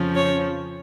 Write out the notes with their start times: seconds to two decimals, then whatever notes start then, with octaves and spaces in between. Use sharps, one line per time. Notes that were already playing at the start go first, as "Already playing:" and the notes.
Already playing: F2 C#3 F3 C#4
0.16 C#5